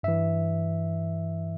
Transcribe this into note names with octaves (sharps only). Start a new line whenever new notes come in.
G2 E3 E5